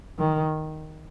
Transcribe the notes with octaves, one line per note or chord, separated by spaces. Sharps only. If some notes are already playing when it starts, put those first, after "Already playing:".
D#3